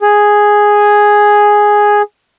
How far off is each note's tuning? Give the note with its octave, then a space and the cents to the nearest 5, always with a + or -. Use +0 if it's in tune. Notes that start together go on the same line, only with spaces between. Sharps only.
G#4 +0 G#5 +0